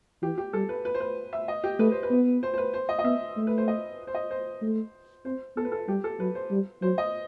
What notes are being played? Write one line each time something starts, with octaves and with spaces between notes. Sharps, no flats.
E3 G4
G4
G3 A4
B4
B4
C5
B4
E5
D#5
G4
A3 B4
C5
B4
B3
C5
C5
B4
C5
D#5
D#5
B3 E5
A3
B4
C5
D#5
C5
D#5
C5
A3
C4 C5
B3 A4
B4
A4
G3 G4
A4
F#3 B4
C5
G3
F#3 C5
D#5